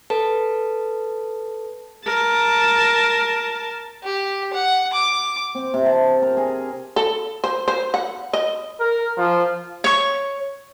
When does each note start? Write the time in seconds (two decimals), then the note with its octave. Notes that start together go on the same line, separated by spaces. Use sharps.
0.10 A4 B4 A5
2.06 A#4 A5
4.03 G4
4.53 F#5
4.93 D6
5.55 C4
5.74 C3
5.86 A5
6.22 A#4
6.37 G#4
6.96 A4
7.44 C5
7.68 C5
7.94 F#5
8.33 D#5
8.80 A#4
9.17 F3
9.84 C#5 C#6